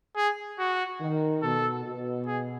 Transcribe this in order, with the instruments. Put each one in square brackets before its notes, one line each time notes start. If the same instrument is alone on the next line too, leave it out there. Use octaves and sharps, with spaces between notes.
[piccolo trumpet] G#4
F#4
[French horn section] D#3
[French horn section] B2 [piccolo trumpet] A4
[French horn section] B2
[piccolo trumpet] G#4